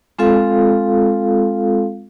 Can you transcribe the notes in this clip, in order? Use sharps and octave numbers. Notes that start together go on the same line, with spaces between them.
G#3 C4 F4 A4 F5